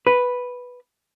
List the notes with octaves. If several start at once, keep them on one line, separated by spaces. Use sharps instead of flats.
B4